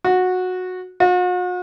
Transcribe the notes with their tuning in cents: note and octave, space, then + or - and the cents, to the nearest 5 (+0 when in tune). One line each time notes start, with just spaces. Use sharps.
F#4 -15
F#4 -45